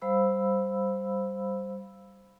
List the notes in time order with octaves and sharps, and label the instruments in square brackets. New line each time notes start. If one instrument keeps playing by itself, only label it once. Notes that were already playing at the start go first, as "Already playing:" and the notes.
[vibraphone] G3 C5 F5 B5 E6